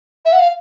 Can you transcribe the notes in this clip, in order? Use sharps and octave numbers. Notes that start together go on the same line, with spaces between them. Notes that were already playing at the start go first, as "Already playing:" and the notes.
E5
F#5
F5